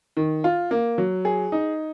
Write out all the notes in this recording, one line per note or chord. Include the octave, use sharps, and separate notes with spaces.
D#3
F4
A#3
F#3
G#4
D#4